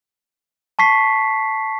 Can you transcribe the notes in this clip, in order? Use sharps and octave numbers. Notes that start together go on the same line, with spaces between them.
A5 C#6 B6 C7